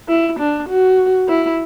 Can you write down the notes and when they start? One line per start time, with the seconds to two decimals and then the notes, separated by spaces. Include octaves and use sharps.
0.09 E4
0.39 D4
0.69 F#4
1.28 E4